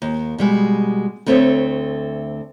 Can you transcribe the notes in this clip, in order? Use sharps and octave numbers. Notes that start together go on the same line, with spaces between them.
D#2
B2 G3 G#3
D2 A3 C4 A4 C#5 E5